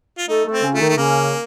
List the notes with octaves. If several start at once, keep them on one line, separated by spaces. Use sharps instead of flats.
F4
A3 D#4 A4
A3 A4
C4
C#3 C#4
A3 F4
D#3 D#4
A3
C#3 A#3 C#4